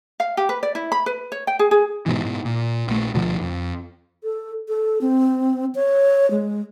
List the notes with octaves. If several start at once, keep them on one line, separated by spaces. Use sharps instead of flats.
F5
G4
B4
D5
E4
B5
B4
C#5
G5
G#4
G#4
G#2 B2 E3
G#2 B2
A#2
A#1 A3
D2 B2 D3 F3
F2
A4
A4
C4
C#5
G#3